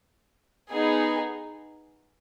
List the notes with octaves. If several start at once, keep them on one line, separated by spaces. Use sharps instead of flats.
B3 D#4 G#4